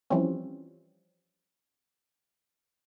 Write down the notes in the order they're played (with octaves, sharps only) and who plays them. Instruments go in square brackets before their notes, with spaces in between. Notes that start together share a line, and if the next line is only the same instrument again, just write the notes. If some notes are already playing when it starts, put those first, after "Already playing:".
[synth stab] E3 F3 G3 C4 C#4